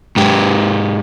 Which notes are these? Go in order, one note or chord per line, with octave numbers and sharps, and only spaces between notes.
G#2 G4